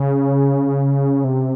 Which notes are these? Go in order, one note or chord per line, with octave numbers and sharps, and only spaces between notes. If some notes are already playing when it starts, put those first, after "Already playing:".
Already playing: C#3
C3